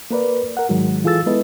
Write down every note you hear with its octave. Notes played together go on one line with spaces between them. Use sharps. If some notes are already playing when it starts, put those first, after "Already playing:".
A#3 A#4 B4 D5
A#4 F#5
G#2 D#3 F#3 G#3
E3 F4 G#4 A4 E6 A6
G#3 B3 E4 A4 B4 D#5